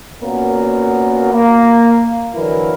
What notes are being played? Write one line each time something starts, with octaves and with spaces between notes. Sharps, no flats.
A#2 A#3 B3 C#4 F#4 A#4
A#3
D3 E3 F#3 E4 A#4 B4